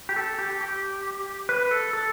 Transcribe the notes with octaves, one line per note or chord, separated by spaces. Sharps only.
G4
A4
G4
G4
B4
A4
A4